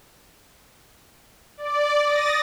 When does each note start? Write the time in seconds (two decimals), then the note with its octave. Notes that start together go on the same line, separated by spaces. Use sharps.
1.57 D5
2.05 D#6 A6 A#6